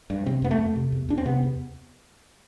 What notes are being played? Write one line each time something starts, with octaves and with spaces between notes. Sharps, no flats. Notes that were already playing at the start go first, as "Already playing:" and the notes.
G2
C3 C4
F2 B3
A3
F2
C3
E2
E2 D4
C4
C3 B3
E2